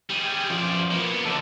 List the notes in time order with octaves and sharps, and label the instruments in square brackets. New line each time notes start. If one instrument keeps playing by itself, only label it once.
[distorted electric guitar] G3 G#4
[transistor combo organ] G4 G#5
[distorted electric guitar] F#2 D5 [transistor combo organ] F3
[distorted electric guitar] A#3 B3
[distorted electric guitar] D#2 D3 [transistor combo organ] A4 A5 D6